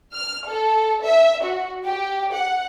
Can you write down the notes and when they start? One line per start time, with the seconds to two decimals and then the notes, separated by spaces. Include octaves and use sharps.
0.13 F6
0.47 A4
1.04 E5
1.44 F#4
1.84 G4
2.32 F#5